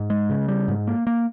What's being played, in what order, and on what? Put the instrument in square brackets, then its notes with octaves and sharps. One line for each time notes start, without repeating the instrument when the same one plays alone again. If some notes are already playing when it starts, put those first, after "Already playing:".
Already playing: [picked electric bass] G#2
G#3
C#3
G3
G#2
A#3
A#3